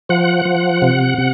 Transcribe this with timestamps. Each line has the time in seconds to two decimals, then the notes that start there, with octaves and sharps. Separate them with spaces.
0.09 F3 F#5
0.45 F3
0.82 C3
1.18 C3